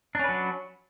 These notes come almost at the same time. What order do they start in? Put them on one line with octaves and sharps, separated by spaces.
D4 C#4 B4 F#3